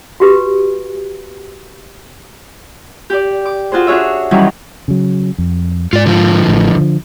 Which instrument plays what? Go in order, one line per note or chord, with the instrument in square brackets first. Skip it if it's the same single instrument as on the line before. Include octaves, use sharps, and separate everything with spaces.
[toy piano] F#4 G4 B4
[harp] G4 D5
D6
F4 F#4 G#4 C5
D4 F#4 G#4 C#5 E5
D#3 E3 F#3 G3 C#4 E4
[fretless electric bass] C#3 F#3
F2
[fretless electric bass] G#2 [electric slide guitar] F4 D5
[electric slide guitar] D3 F3 F4
[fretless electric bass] A1 A2
D3 F3